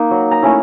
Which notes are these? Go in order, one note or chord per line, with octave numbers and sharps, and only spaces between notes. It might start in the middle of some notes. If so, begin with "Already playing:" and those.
Already playing: A#3 D#4
F#3
A#5
A3 C#4 E4